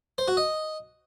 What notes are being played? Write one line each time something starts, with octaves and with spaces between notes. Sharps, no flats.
C5
F#4
D#5